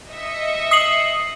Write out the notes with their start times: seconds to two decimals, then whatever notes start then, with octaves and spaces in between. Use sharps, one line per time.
0.11 D#5 E5 C#7
0.71 D#6 C7 F#7